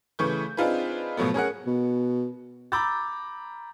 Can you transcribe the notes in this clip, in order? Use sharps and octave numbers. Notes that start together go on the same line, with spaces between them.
C#3 E3 A3 B4 C#6 G6
C4 D4 D#4 F4 G#4 B4
B2 F3 F#3 A3 B3
C#4 G#4 A#4 F#5
B2
A#5 B5 D6 E6 G6 A6